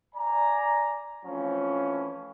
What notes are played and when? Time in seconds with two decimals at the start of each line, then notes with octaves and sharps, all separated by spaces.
0.15 D5 G#5 A#5
1.26 E3 F3 A3 C4 C#4